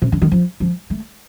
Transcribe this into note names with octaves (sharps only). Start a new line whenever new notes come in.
C3
D3
D#3
F3
F3
A3